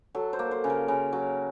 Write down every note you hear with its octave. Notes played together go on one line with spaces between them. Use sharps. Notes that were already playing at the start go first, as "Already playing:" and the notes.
F#3 A4
C5
A#3
C5
C#3
A#4
C#3 A#4
F#3